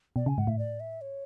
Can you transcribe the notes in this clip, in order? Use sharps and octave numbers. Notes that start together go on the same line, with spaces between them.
B2 D5
C#3 G#5
G#2 F#5
A2 E5
D5
E5
C#5